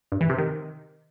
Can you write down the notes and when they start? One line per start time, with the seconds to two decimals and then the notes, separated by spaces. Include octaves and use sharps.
0.12 G2
0.21 E3
0.30 C3
0.38 D#3